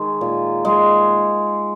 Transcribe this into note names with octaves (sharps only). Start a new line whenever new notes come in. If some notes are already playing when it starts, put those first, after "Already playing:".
Already playing: D#3 G#3
A#2
G#3